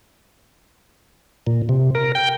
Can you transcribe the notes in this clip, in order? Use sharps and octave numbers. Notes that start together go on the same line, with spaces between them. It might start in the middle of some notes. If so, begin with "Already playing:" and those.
A#2
C3
A#4
G5